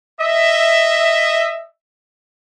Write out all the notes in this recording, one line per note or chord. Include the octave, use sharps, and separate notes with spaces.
D#5 E5